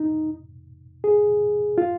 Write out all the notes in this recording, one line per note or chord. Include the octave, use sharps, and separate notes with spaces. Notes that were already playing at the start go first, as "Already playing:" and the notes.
Already playing: D#4
G#4
F4